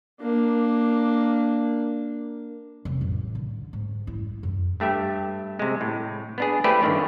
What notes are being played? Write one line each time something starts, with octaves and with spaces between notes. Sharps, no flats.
A#3 D4
F1
A1
D3
G#2
E4
F#2
G2 A3 G4 E5
C3 G#3
A2
B3 D4 G#4
A3 E4 G4 B4 C5 D5
G1 D3 D#3 D4 C#5